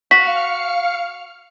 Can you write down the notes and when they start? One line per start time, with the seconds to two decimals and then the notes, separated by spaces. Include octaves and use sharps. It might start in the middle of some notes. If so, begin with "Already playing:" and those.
0.11 F#4 F5 F6 B6 C#7